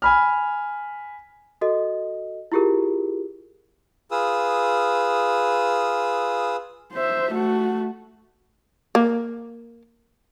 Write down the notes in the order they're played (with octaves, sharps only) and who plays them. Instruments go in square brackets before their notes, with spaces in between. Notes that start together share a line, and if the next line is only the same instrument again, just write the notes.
[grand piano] G#5 B5 F6
[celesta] F#4 A4 D#5
E4 F4 G4 G#4 A#4
[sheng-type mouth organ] F4 G#4 B4 D#6 E6
[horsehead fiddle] C5 E5
A3 F#4
[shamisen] A#3